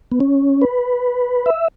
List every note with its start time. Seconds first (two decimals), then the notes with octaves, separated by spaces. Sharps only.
0.12 B3
0.20 C#4
0.62 B4
1.46 E5